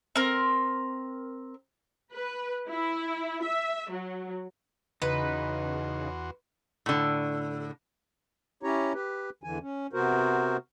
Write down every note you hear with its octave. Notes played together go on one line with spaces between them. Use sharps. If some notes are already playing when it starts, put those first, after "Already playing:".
C4 A#4
B4
E4
E5
F#3
E2 C#3 D#4 F#4 B4 C6
A2 D3
C#4 E4 G4 C#5 A#5
G4 B4
E2 D3 E3 G#5
C#4
C3 B3 F#4 A#4 C5